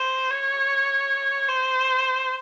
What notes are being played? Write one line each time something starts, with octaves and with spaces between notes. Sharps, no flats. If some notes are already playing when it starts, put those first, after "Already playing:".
Already playing: C5
C#5
C5